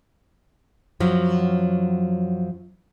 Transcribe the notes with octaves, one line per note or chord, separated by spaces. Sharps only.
F#2 F3 F#3